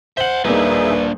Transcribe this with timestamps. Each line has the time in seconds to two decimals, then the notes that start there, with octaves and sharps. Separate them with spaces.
0.17 C5 E5 F#5 F#7 G7
0.45 D#1 A#2 A#3 D4 D#4 G#4 B4 E5